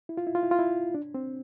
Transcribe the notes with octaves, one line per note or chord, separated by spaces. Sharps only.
E4
F4
E4
F4
E4
F4
E4
D4
C4